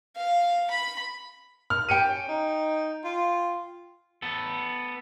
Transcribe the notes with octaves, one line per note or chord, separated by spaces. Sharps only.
F5
B5
F6
G4 G5 C#7 D#7
C#4
D#4
F4
B3 A4